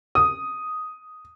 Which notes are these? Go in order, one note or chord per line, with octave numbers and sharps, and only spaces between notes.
D#6